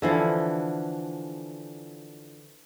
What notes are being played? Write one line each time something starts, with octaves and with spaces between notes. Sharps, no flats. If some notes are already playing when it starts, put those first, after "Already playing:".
D3 E3 F3